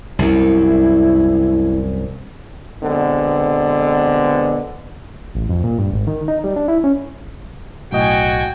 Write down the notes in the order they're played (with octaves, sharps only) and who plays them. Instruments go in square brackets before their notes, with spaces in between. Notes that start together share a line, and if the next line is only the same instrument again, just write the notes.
[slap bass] C2 F#2 [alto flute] E4
[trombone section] B2 D3 G#3 B3 C4
[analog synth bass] A1
F2
A#2
G2
G#1
D#3
D#4
G3
D4
E4
C#4
[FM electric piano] B1 A2 D#5 [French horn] F#4 [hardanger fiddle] G5 G#5